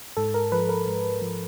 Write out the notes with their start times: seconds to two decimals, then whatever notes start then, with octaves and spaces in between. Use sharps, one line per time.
0.17 G#2 A4
0.34 A#4
0.52 F3 B4
0.69 A#4
0.87 G#2
1.22 F3